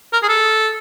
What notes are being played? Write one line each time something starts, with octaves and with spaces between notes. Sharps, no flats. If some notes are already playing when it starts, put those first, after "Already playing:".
A#4
G#4
A4